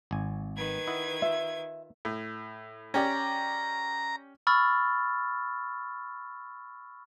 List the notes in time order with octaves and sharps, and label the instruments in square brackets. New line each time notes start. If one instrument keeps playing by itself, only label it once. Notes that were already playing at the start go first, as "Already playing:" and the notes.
[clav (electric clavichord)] G#1 G#5
[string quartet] D#3 B4 G#6
[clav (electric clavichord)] E4 D#5 F#5
[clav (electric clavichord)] F4 [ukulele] E5
[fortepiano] A2
[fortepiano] C#4 G4 D5 [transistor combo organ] A#5
[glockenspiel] B5 C#6 E6 F6 A6